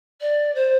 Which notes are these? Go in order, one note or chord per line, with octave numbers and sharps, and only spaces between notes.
D5
C5